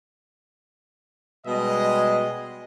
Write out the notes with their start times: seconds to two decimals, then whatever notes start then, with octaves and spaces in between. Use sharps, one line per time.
1.47 B2 G3 G#3 D#5